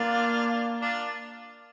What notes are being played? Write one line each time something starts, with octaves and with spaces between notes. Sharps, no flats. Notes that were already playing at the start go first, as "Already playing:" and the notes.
Already playing: A#3 D4 F4
D4 F4